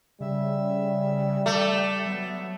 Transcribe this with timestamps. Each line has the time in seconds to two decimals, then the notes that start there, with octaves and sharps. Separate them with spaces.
0.20 C#3 G3 E5
1.46 A3 D5
2.06 F#3 B3